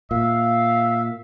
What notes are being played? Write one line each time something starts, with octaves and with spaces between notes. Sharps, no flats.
A#2 E5 F5